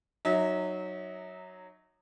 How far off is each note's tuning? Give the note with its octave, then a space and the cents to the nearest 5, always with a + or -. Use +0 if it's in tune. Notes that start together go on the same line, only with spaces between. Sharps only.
F#3 +0 D#4 -25 E5 -35